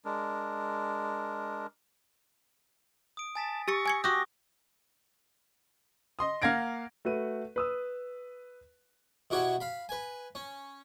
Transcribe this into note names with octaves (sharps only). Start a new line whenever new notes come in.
G#3 D4 A#4
D#6 D7
G#5 A5 A6 B6
G4 C#6 E6 A6 A#6 C#7
G#5 G#6 C#7
F#4 G4 C#6 D#6 A#6
D#5 C6 D#6
A#3 F5 F#5 G#6 A#6 D7
A3 F#4 B4 D#7
B4 D#6 E6
B2 E4 F#4 G4 C#5 F#5
F5 B5
B4 G#5
C#4